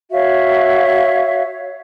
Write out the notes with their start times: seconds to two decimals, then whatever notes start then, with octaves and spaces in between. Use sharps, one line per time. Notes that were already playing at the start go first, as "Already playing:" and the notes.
0.11 F#4 C#5 E5 F5